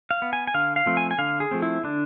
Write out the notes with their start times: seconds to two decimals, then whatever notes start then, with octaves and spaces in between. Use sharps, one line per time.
0.11 F5
0.22 B3
0.33 G#5
0.47 G#5
0.54 D3 F5
0.76 F5
0.86 F3 A3 C4
0.97 G#5
1.11 G#5
1.18 D3 F5
1.40 G#4
1.51 F3 A3 C4
1.62 E4
1.83 D3 D4